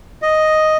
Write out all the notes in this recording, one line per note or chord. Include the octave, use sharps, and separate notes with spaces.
D#5